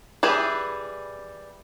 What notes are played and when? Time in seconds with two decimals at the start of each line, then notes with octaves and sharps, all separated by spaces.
0.23 E3 G3 G#4 B4